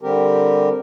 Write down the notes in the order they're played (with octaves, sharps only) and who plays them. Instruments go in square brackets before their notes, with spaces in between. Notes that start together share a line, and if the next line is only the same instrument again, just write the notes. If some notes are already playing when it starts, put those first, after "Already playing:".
[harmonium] D3 G3 C4 G4 A#4